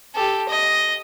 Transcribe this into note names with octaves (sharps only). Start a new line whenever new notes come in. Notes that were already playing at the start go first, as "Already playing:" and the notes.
G4 A4
D#5